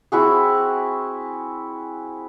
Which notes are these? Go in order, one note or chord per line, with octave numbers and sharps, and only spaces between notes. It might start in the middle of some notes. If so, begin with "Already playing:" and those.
C4 E4 F#4 G#4